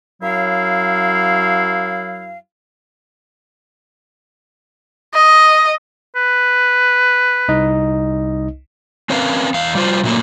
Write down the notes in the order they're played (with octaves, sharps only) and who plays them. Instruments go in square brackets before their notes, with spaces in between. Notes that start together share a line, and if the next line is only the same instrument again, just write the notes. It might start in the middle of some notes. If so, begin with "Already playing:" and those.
[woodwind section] F#2 F#3 E4 F5
[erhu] D#5
[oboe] B4
[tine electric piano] C2 D#4 D#5
[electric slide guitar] C4 C#4 A#4 B4 F5
E2 F5
G3 F4 C5
A#2 F#3 A3 A#3